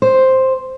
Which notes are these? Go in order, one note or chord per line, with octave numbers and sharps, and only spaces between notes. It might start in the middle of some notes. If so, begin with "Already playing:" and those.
C5